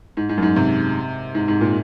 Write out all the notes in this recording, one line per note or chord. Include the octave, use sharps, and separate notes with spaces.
G#2
G#2
F#2
G#2
C3
G#2
G#2
A#2